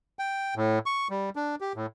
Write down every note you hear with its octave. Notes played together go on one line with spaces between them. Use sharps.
G5
A2
C#6
G3
D4
G4
A2